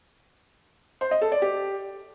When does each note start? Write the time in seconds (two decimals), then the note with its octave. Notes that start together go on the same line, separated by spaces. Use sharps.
1.01 C5
1.11 D#5
1.21 A4
1.32 D5
1.42 G4